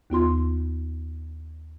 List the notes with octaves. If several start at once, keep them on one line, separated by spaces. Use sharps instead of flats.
D#2 B3 F4 C6